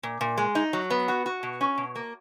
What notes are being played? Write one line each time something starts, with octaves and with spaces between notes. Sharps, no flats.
A#2
A#2
G#3
D#4
F#3
B3
F#4
F#4
B2
C#4
B2
A#3